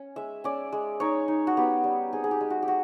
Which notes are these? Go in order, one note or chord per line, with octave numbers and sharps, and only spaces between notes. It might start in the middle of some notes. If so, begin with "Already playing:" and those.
Already playing: C#4
G#3 E5
C#4 D5
G#3
D#4 C#5
D#4
F#4
B3 G4
G3
C4 G#4
G#4
G4
G#3
F#4
G4
F#4